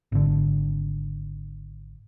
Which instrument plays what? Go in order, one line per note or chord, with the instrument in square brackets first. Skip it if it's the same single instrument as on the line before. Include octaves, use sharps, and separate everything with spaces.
[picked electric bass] G#1 D3